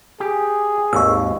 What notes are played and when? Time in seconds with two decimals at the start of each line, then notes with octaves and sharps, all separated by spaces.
0.20 G4 G#4
0.93 G#1 D#2 C#6 E6